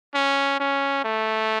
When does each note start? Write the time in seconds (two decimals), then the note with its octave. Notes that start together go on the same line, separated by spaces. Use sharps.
0.14 C#4
0.60 C#4
1.04 A3